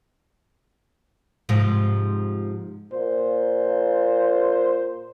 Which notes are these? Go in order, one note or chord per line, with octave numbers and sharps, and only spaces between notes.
G#2 C3 F3
A#2 C5